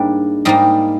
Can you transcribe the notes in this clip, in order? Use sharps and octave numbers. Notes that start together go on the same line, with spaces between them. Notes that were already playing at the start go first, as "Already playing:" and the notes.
Already playing: G#2 G3 A#3 D4
G#2 G3 A#3 D#4